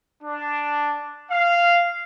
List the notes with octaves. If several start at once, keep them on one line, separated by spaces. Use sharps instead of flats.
D4
F5